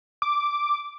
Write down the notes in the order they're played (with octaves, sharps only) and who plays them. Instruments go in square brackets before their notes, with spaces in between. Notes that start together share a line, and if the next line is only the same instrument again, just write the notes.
[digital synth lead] D6